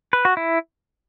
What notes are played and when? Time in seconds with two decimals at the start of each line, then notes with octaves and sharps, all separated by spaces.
0.13 B4
0.25 F#4
0.37 E4